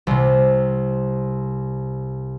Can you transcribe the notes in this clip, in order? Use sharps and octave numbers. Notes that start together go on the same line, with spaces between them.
C2 C3